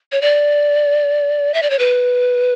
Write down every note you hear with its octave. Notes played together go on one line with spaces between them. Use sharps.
C#5
D5
E5
D5
C#5
B4